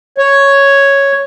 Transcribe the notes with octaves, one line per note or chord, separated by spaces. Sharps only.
C#5